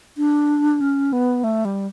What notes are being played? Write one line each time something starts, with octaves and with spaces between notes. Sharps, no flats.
D4
C#4
B3
A3
G3